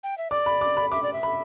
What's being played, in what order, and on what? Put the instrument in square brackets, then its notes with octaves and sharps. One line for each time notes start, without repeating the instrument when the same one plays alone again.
[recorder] G5
E5
[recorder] D5 [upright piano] D6
[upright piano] B5
D6
B5
[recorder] E5 [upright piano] D6
[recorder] D5
E5
[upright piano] B5